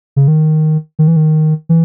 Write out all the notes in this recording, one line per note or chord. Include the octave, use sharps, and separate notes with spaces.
C#3
D#3
D#3
E3
D#3
E3